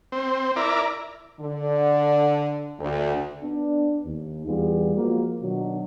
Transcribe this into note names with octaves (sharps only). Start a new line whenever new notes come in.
C4
E4 A#4 D5
D3
D2
B3 D4
D#2
E2 E3 G3 B3 F4 G#4
F3 G#3 A#3 F4 F#4
B2 D#3 F#3 D4 D#4 F#4